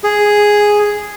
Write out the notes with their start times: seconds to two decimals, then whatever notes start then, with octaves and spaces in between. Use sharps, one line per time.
0.04 G#4